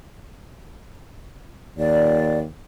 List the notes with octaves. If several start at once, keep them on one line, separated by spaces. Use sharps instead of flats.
D#2 D5